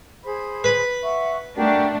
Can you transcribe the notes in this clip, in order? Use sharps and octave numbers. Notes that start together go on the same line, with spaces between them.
G#4 C5 B5
B4
E5 F#5 C#6
A3 D4 F#4 G4 A#4